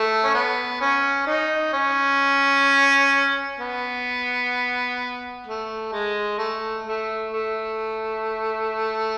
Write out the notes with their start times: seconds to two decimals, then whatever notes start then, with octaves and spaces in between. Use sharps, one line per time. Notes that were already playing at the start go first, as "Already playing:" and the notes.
Already playing: A3
0.24 C#4
0.34 B3
0.81 C#4
1.27 D#4
1.73 C#4
3.59 B3
5.46 A3
5.92 G#3
6.38 A3
6.85 A3
7.32 A3